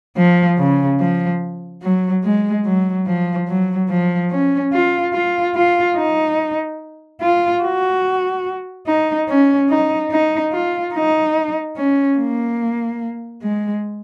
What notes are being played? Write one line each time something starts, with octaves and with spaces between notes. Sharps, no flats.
F3
C#3
F3
F#3
G#3
F#3
F3
F#3
F3
C#4
F4
F4
F4
D#4
F4
F#4
D#4
C#4
D#4
D#4
F4
D#4
C#4
A#3
G#3